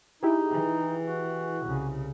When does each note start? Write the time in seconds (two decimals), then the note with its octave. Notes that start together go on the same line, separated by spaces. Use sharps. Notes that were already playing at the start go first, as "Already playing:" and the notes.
0.23 D#4 E4 G4 G#4
0.52 E3
1.04 F#4
1.64 C2 C#3